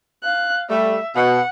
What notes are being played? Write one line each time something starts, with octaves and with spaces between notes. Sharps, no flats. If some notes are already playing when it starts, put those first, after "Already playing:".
F5 F#6
G3 A3 E5
B2 F#5